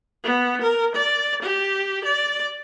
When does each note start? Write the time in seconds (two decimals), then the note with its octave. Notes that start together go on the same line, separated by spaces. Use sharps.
0.24 B3
0.62 A#4
0.95 D5
1.42 G4
2.04 D5